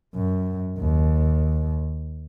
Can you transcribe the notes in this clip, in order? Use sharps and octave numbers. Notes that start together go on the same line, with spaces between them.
F#2
D#2